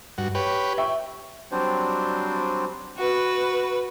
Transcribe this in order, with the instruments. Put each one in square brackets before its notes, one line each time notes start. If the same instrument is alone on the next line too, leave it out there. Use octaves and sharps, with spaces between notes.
[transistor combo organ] G2 F#4
G4 B4 C#5
[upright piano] E5 G5 C#6
[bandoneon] F#3 G3 C4 D4 C5
[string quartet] F#4 B4